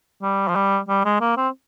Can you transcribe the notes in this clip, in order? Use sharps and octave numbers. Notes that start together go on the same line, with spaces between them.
G3
F3
G3
G3
G#3
A#3
C4